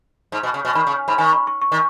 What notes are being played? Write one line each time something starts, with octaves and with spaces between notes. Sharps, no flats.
G#2
B2
C#3
B2
D#3 B5
C#3
G#2 B5
D#3 G#5
B5
C#6
C#6
D#3